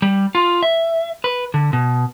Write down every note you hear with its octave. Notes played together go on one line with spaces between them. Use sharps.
G3
F4
E5
B4
D3
B2